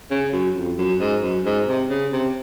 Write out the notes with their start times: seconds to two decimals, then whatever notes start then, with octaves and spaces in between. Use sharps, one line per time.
0.11 C#3
0.33 F#2
0.55 F2
0.78 F#2
1.00 G#2
1.23 F#2
1.46 G#2
1.68 C3
1.89 C#3
2.12 C3